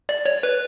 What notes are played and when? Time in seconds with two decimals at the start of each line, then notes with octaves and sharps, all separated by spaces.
0.09 D5
0.25 C#5
0.43 B4